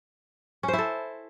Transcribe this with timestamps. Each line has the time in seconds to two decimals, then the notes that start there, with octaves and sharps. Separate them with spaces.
0.63 C#4
0.68 C5
0.73 E4
0.78 A4